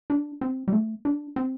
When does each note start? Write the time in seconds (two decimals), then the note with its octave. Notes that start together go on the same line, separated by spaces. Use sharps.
0.10 D4
0.41 C4
0.68 G3
0.73 A3
1.05 D4
1.36 C4